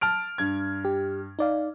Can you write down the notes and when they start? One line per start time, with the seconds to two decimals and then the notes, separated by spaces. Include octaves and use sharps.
0.01 A5 F6 D7
0.38 G2 G#6
0.85 G4
1.39 D#4 D5 F5